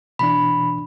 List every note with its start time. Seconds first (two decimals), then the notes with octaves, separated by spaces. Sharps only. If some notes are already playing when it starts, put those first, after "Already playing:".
0.19 B2 E3 D4 B5